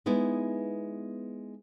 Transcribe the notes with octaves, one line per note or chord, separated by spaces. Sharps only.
G#3 B3 D#4 E4